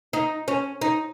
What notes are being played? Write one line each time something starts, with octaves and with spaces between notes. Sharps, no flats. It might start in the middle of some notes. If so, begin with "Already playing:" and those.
D#4
C#4
D#4